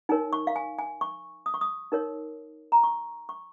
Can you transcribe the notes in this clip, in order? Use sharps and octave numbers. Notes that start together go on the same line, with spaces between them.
D#4 A#4 C#5 G#5
C#6
F5
G#5
G#5
C#6
D#6
C#6
D#6
D#4 A#4 C#5
A#5
C#6
C#6